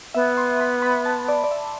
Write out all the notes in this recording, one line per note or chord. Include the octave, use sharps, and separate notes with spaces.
B3 E5
C6
B5
B5
A5
D5
D5
E5